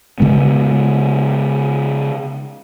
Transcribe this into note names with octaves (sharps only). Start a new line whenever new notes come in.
C#3 G#3 B3